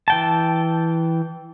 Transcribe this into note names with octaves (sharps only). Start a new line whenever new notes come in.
E3 G5 A5